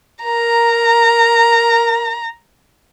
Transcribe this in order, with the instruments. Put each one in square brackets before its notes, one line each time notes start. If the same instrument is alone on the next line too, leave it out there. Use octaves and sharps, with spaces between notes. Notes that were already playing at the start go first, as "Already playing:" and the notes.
[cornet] A#4 [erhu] A#5